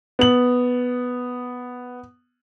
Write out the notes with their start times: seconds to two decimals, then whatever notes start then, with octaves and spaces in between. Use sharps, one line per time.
0.19 B3 F#7